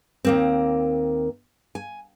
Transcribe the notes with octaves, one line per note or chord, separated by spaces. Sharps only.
D#2 A#3 C4
G#5